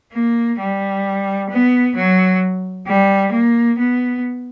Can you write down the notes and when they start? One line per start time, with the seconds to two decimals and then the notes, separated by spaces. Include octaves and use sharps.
0.13 A#3
0.59 G3
1.50 B3
1.96 F#3
2.87 G3
3.33 A#3
3.79 B3